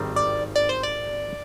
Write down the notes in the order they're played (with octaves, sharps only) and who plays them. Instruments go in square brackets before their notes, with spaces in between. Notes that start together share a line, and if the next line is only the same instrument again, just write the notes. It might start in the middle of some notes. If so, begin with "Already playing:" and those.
Already playing: [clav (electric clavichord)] G#1 G2 D#3 G3 C4
[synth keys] D5
D5
C5
D5